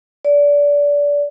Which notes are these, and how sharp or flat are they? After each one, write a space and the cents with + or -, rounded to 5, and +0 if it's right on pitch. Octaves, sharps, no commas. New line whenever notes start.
D5 -25